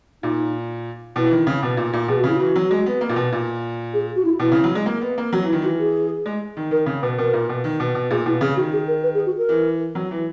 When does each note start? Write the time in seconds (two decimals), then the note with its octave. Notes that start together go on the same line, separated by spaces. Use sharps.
0.23 A#2 D#4
1.16 B2 E4
1.26 E3
1.31 D#3
1.47 C#3
1.63 B2
1.77 A#2
1.93 A#2
2.08 B2 G#4
2.18 F#4
2.24 C#3
2.29 E4
2.39 E3 F#4
2.56 F#3
2.71 G#3
2.86 B3
3.01 A#3
3.09 A#2
3.16 B2
3.32 A#2
3.94 G#4
4.16 F#4
4.25 E4
4.39 B2 E4
4.52 C#3
4.64 F#3
4.75 G#3
4.86 A#3
5.01 B3
5.18 A#3
5.33 F#3 F#4
5.42 E3
5.48 E4
5.52 D#3
5.62 E3 F#4
5.79 G#4
6.26 G#3
6.57 D#3
6.71 D#3 A#4
6.86 C#3
7.02 B2 B4
7.18 B2 A#4
7.33 A#2
7.49 B2
7.64 D#3
7.80 B2
7.95 B2
8.11 A#2 G#4
8.26 B2 E4
8.41 C#3 G#4
8.56 D#3 F#4
8.72 G#4
8.87 A#4
9.03 B4
9.15 G#4
9.26 F#4
9.38 A#4
9.49 E3
9.95 F#3
10.11 E3